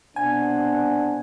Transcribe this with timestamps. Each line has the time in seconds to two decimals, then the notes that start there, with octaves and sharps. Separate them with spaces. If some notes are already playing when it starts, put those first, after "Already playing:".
0.16 C2 B2 D4 C5 F#5 G#5